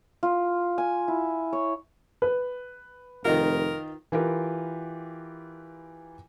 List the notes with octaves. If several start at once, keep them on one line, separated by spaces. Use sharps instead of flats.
F4
G#5
E4
C#5
B4
F1 D#3 D#4 F4 A#4
E3 F4 G4 A#4 B4